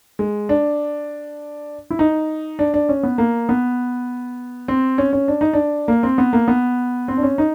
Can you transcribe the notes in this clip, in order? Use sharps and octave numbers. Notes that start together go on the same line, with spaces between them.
G#3
D4
E4
D#4
D4
D4
C#4
B3
A#3
B3
C4
C#4
C#4
D4
D#4
D4
A#3
C4
B3
A#3
B3
C4
D4
C#4
D#4